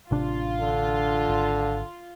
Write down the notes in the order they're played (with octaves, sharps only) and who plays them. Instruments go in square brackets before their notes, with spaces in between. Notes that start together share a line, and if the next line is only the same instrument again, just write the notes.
[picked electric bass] A1 C3 D4 [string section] F4
[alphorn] D3
[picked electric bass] G#1